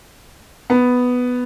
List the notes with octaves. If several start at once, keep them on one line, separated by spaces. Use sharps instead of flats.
B3